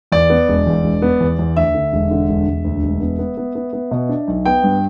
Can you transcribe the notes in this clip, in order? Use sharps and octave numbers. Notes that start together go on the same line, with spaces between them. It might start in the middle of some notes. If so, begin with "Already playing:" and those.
E2 D5
B3
E1
E2
E1
B3
E2
E2
D2 E5
D3
E1
D3
E1
E1
D2
E1
B3
B3
B3
B3
B3
B2
D4
B1
B3 G5
G2